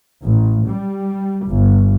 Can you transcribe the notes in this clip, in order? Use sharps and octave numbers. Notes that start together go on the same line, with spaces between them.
A1
G3
G1